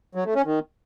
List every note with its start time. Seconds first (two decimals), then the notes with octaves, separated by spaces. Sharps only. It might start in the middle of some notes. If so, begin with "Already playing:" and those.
0.15 F#3
0.25 A3
0.35 C#4
0.45 D#3